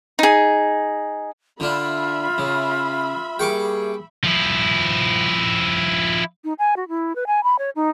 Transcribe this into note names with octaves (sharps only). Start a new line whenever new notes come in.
D#4 G#4
D3 D4 F4 E5 B5
C#3
G3 A#3 G#4 G5 C#6 D6
F3 E4
D#4
G#5
F#4
E4
B4
G#5
B5
C#5
D#4